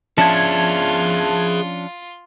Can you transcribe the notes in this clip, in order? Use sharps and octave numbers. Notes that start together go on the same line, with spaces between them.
F3 C#4 D4 F4 G#4 E5 A5 G#6